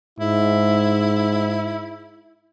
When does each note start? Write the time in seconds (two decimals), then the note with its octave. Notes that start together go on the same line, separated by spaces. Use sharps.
0.19 G#2 E4